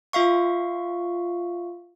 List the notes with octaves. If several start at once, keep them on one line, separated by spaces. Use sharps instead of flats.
F4 E5 F5 C#6